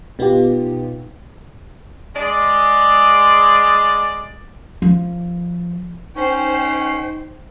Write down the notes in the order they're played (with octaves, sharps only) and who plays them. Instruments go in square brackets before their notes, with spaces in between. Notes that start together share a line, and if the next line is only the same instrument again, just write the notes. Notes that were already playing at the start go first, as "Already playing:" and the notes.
[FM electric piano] B2 B3 D#4 F4 G4
[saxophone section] G#3 D5
[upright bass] F3
[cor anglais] C#4 [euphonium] D#4 [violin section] C5 G5 C7